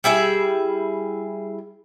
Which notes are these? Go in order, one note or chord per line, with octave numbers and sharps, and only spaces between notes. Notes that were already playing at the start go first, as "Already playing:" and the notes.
G3 E4 G#4 E5